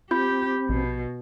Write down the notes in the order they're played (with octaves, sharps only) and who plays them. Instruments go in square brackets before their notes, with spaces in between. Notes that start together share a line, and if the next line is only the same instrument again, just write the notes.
[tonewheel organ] C4 [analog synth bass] F4 [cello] G4 [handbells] B5 G6
[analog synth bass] A#1 [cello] B2